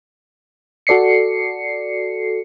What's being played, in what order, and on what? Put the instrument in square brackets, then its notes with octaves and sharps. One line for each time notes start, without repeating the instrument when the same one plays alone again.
[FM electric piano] F#4 A4 D5 C7 C#7